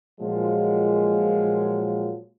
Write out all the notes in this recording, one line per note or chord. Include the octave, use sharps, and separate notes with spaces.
A#2 F3 F#3 G#3